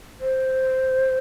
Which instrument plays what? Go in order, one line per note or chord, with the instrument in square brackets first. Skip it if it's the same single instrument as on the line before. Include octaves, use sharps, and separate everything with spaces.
[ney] C5